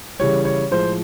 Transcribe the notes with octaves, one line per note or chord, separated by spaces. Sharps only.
C#3 E3 G3 C#5
C#5
A2 F3 G#3 C5